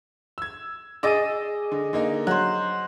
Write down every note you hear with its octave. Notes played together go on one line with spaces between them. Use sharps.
E6 G#6
G#4 D#5 D6 E6 A6 D#7
D3
D3 A#3 D#4
F#3 C5 F#5